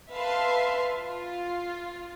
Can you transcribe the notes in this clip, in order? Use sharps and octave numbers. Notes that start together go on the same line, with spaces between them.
B4 E5 F5 A5 C6
F4